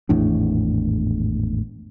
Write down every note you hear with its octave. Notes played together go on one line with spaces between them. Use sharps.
G#1 E2 A2 D4